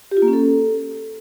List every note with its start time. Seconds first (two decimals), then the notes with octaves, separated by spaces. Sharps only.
0.11 G4
0.17 F4
0.22 A#3
0.28 C#4
0.33 A4